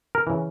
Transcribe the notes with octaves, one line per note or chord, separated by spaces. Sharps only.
A#4
C#3 E3